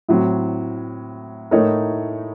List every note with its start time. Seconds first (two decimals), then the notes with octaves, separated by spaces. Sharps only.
0.09 A2 F#3 C4
1.51 A2 A3 D#4 A#4 C#5